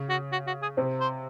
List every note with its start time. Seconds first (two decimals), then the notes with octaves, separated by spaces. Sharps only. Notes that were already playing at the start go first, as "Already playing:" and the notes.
Already playing: C#3 C#4
0.09 F#4
0.32 F#4
0.47 F#4
0.62 G#4
0.77 C3 C4
1.00 C5